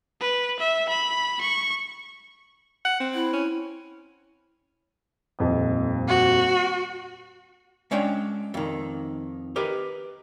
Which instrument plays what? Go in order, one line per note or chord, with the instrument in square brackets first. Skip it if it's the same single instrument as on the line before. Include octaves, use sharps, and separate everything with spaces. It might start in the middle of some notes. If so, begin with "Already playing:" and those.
[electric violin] B4
E5
B5
C#6
[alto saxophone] F#5
C4
[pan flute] E4
[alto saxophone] C#4
[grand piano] D#1 F2 D#5
[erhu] F#4
[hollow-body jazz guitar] G#3 C#4 D4 G5
F2 D#3
G4 A#4 B4 D#5